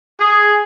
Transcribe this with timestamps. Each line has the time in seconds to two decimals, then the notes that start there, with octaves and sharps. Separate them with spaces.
0.19 G#4